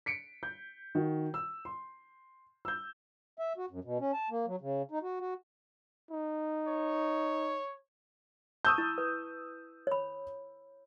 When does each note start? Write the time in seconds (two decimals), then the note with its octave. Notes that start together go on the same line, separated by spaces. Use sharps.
0.06 B6 C#7 D7
0.43 G6
0.95 D#3 F#4
1.34 E6
1.65 C6
2.65 E6 G6
3.39 E5
3.58 F#4
3.71 F#2
3.84 B2
4.00 C#4
4.13 A5
4.30 A#3
4.47 F#3
4.61 C#3
4.91 D#4
5.03 F#4
5.20 F#4
6.11 D#4
6.67 C#5
8.65 A5 C#6 D#6 E6 G6
8.78 E4
8.98 B4
9.87 C#5 B5